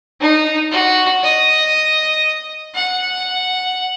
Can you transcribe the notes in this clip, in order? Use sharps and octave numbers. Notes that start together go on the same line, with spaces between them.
D#4
F#4
D#5
F#5